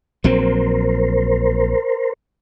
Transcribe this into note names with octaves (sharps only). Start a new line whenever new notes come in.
A#1 F#3 C4 A#4 C5